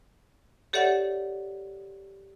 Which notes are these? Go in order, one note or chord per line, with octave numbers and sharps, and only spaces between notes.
G4 A4 C#5 D5 E5 F#5